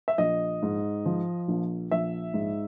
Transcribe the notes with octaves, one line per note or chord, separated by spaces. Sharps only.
E5
A#1 D#5
G#2
F3
A#1
A#1 E5
G#2